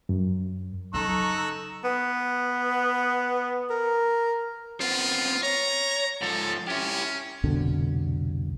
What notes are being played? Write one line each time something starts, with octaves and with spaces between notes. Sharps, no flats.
F#2
C#3 F#3 D#4 A4 A#5 C#6 E6 F#6
B3
A#4
B3 C4 F4
C#5 A#5
G#2 F3 A4
C#4 E4 G4
C2 F2 B2 D3